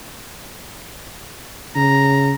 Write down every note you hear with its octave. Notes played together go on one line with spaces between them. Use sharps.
C#3 A#5